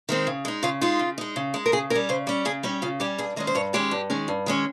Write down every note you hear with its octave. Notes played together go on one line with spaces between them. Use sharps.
D#3 G#3 C4
C#3
G#3 D#4
C#3 F4
G#3 D#4 F4
C#3
G#3 D#4
C#3
G#3 D#4
A#4
C#3 G#4
G3 C#4 A#4
C#3 C5
G3 C#4
C#3 G#4
G3 C#4 D#4
C#3 F4
G3 C#4 G4
G2 G#4
D#3 G#3 C#4 D#5
C5
G2 C#5
D#3 G#3 C#4 G4
G2
D#3 G#3 C#4
G2
D#3 G#3 C#4